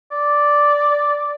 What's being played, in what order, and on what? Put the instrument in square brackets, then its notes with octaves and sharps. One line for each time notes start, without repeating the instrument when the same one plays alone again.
[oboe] D5